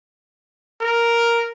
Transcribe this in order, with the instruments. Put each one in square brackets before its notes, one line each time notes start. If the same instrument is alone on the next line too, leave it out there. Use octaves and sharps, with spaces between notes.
[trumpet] A#4